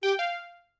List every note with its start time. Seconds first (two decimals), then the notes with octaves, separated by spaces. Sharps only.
0.03 G4 G5
0.19 F5